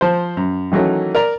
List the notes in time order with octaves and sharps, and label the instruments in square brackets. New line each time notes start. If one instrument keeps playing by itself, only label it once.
[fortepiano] F3 C5
F#2
D#3 E3 F#3 A3 C#4
A#4 D5 A#5